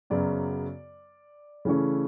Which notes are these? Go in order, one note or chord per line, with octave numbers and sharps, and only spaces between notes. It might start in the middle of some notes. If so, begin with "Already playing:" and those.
F#2 C#3 F#3 B3 D5
C#3 E3 A3 C#4